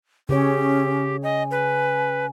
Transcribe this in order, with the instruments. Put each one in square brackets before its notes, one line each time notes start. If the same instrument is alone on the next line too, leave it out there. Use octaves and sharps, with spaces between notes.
[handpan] C#3 G#4 C#5 [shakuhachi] C#4 [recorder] G4
[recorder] D#5 [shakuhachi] G#5
[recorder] B4